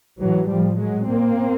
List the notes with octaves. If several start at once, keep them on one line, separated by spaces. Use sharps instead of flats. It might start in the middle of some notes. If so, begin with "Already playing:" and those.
A2 E3 F#3
A2 F3 G3
A#2 F#3 G#3
A#2 A#3 C4